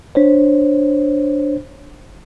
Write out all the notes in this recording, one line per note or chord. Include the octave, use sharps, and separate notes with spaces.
D4 C5 C#5